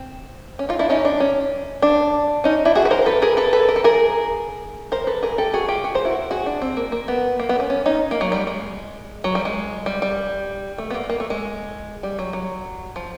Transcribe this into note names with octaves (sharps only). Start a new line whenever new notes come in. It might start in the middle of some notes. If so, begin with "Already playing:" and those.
Already playing: C4
C#4
D#4 F4
D4 E4
C#4 D#4
D4
C#4
D4
C#4 D#4
D4 E4
F#4 G#4
B4
A#4 C5
C5
A4 B4
G#4 A#4
A4 B4
A4 B4
A#4
A4
G#4 A#4
A#4 C5
A4 B4
G#4 A#4
G4 A4
F#4 G#4
F4 G4
F#4 G#4
A#4 C5
E4 F#4
F#4 G#4
D4
C4
A#3
A#3
B3
A#3
B3
C#4
C#4
C#4 D#4
A#3
F#3
G3
G#3
F#3
G3
G#3
G3
G3
A3
B3
A#3
A#3
A3
G#3
G3
F#3
F#3
F3